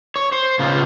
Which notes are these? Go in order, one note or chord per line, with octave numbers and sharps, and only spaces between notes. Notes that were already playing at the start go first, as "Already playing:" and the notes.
C#5
C5
C#3 B3 F4